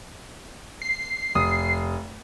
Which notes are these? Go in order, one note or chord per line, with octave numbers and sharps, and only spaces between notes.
C7
F1 D#6